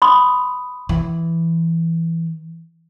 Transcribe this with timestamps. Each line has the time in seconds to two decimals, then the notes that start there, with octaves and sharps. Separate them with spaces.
0.02 B5 C6 D#6
0.89 E3